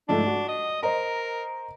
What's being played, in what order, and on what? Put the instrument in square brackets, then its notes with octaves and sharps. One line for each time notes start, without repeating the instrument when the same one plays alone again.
[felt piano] G#2 F3 A3 [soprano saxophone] D4
[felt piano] F#4
[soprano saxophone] D#5
[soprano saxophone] A#4 [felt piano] C5 D#5 A#5